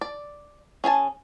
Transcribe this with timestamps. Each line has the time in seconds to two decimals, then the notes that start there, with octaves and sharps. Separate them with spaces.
0.01 D5
0.84 C#4 G#4 G#5 A5